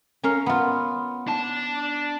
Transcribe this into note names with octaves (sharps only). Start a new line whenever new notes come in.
C#4 A#4 F5
B3 F4
D4 A5